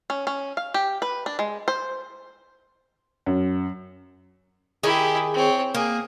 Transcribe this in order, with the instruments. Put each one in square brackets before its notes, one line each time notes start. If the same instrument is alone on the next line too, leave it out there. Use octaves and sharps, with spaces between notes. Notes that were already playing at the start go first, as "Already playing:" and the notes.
[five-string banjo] C#4
C#4
F5
G4
B4
D4
G#3
C5
[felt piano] F#2
[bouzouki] D#3 G#4 [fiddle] E4 G4
[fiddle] C4 C#5
[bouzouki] A#3 [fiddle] G#4